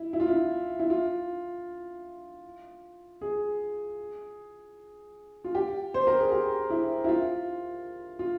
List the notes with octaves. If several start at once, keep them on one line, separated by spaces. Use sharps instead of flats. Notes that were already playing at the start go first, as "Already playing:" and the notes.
Already playing: E4
E4
F4
E4
E4
F4
G#4
F4
G4
C5
A#4
G#4
G4
E4
E4
F4
F4